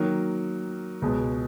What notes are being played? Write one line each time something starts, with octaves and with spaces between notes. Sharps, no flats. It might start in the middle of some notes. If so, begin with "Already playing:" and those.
Already playing: D#3 F#3 A#3
C#2 B2 G#3